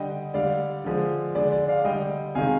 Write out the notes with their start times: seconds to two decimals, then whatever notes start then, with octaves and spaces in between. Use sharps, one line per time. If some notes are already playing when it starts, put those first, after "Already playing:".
Already playing: D3 G3 D#5 G5
0.34 D3 G3 D5 F5
0.84 D3 F3 G#3
1.35 D3 G#3 D5
1.52 D5
1.68 D5 F5
1.85 D3 G3 D#5 G5
2.35 C3 D#3 G#3 F5 G#5